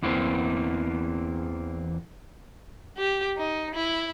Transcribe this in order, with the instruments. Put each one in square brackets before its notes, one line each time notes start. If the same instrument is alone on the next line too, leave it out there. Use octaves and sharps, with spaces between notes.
[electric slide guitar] E2 E3 A#3 C4
[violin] G4
D#4
E4